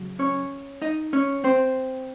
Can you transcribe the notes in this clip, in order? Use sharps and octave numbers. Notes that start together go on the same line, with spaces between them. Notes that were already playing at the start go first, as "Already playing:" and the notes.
Already playing: C#3 F#3
C#4 C#5
D#4 D#5
C#4 C#5
C4 C5